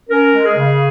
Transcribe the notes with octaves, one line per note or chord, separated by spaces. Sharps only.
C#4 A#4
G#3
G#4
C#3